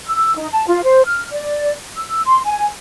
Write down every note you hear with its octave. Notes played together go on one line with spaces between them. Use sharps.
E6
D#4
A5
F4
C5
F6
D5
E6
C6
G#5